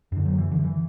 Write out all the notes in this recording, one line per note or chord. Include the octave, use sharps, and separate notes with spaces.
F#2 D3
F#3
E3
D3
E3